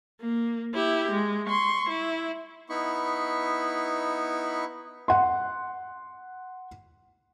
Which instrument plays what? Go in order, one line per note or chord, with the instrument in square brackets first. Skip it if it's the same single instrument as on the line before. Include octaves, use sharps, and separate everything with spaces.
[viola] A#3
E4 G4
G#3
C6 C#6
E4
[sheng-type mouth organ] B3 D#4 E4 B5 C#6
[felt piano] F#5 C6